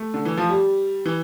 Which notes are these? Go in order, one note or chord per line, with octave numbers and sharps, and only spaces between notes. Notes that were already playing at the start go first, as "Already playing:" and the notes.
Already playing: A3
D3
E3
F3
G3
E3